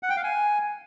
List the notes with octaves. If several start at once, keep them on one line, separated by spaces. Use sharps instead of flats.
F#5
G5
F5
G#5